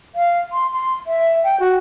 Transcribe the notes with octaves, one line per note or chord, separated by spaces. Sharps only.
F5
C6
C6
E5
G5
F#4